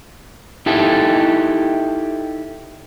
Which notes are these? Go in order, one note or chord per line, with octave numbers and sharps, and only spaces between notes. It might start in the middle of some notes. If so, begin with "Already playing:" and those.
D#4 E4 G4 A4